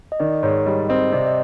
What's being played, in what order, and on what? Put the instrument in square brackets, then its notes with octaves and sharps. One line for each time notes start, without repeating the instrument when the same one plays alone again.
[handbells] D#5
[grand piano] D#3 [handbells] D5
[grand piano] G#2 [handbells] C#5
[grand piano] G3 [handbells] D#5
[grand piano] C4 [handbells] D#5
[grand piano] C3 [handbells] D5
[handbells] D#5